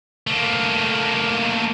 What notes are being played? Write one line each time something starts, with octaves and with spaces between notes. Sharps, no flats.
A3 A#3